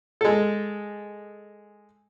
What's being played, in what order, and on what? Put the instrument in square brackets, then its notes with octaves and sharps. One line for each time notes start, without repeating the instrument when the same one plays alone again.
[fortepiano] G#3 A4